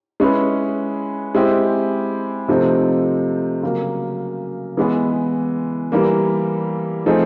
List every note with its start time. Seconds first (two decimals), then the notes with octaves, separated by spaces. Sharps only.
0.20 G#3 C#4 E4 G#4 B4
1.35 G#3 C4 E4 G4
2.48 C3 F3 A3 C4 D#4
3.63 C#3 F#3 A#3
4.77 E3 G#3 B3
5.92 E3 G3 A#3
7.06 F3 A3 C4 D#4 G#4